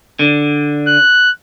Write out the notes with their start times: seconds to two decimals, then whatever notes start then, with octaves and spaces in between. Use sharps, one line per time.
0.19 D3
0.87 F#6